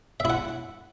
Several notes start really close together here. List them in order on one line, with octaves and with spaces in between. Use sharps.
E5 E4 F#5